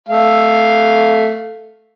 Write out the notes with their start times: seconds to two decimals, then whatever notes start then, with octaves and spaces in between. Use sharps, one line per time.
0.09 A3 F5